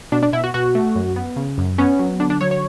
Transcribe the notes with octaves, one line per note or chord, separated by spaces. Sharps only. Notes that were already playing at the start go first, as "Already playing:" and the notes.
B2 D4
D4
B2 E4
F#4
B2 F#4
A3
F#2
B3
C#3
F#2
B3 C#4
F#3
D3 D4
D4
F#3 C#5
C#5